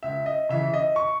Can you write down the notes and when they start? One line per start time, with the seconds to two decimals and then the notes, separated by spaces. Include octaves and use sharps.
0.03 C#2 E5
0.26 D#5
0.49 C#3 E3 E5
0.74 D#5
0.96 C#6